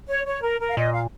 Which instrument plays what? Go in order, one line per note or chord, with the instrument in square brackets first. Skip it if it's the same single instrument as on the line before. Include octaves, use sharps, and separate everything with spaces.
[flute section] C#5
C#5
A#4
A#4
F5
[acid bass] A#2 [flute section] D#5
[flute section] F5